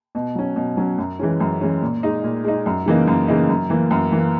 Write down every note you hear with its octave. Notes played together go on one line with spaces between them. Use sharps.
B2
F#3 C#4
B2
F#3 C#4
F#2
E3 G#3 C#4
F#2
E3 G#3 C#4
A#2
G#3 D#4
A#2
G#3 D#4
F#2
C#3 E3 A#3 D#4
F#2
C#3 E3 A#3 D#4
F#2
E3 A#3
F#2
E3 A#3